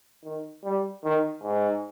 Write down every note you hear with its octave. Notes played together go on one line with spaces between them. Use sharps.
D#3
G3
D#3
G#2